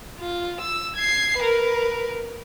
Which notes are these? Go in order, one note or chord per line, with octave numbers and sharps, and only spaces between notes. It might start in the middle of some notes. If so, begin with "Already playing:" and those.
F4
E6
G#6 C7
A#4 B4